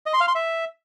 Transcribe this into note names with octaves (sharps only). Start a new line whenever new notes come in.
D#5
C6
F5
C6
E5